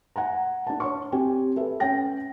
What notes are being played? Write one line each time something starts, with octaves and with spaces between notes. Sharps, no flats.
F#5 G#5 A#5
D4 A5
C#5 C#6
C4 G4 G5 G#5
A4 B4 E5
C#4 C#5 G5 A#6